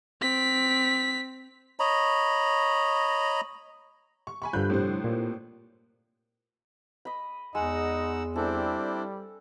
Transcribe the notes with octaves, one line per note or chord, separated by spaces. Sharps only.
C4 B6
C#5 D#5 A#5 B5
C#6
G#5 B5 C#6
G2 D3 F3 B5 F#6 G6
A2 C3 C5
A#2
D#5 B5
E2 G#3 D#4 D#5 F#5 E6
G3 C4 D4 E4 A4